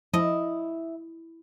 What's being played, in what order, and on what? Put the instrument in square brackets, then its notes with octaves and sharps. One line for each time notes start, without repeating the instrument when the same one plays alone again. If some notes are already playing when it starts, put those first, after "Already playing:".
[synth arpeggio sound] F3 [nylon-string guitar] E4 [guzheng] D#5